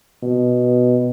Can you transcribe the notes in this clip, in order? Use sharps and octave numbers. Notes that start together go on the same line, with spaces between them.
B2